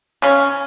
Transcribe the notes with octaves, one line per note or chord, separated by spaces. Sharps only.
C#3 C#4